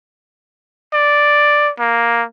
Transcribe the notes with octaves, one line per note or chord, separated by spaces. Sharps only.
D5
A#3